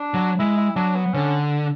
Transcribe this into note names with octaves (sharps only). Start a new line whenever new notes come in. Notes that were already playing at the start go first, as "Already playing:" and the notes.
Already playing: D4
F#3
G#3 E4
E4
F#3 D4
B3
D3 C#4